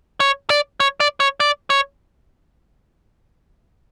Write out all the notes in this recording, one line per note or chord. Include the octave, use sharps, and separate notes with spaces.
C#5
D5
C#5
D5
C#5
D5
C#5